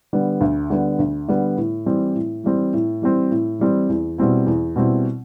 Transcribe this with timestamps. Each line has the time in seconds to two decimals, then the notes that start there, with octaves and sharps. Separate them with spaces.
0.13 D3 G3 B3
0.41 D2
0.70 D3 G3 B3
0.99 D2
1.28 D3 G3 B3
1.57 A2
1.86 E3 G3 C4
2.15 A2
2.44 E3 G3 C4
2.73 A2
3.02 E3 G3 C4
3.31 A2
3.59 E3 G3 C4
3.89 E2
4.18 B2 G3 C4 E4
4.46 E2
4.76 B2 G3 C4 E4